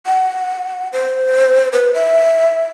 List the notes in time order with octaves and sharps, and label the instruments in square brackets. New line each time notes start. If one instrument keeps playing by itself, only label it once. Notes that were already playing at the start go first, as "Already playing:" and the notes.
[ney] F#5
C5
B4
E5